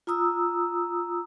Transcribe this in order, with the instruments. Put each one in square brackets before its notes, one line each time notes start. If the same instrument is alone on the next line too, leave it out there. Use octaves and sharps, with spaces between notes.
[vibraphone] F4 A#5 D#6 E6